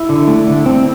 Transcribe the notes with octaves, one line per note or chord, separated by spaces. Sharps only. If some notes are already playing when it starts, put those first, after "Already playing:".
Already playing: E4
D3
A3
D3
C4